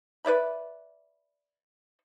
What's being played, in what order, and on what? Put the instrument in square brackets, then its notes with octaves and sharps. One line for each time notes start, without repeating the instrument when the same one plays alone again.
[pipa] B4 D5 E5 B5